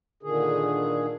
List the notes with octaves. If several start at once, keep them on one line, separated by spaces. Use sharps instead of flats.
A#2 D3 D#3 G#4